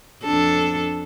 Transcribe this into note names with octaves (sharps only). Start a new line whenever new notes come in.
F2 D4 A4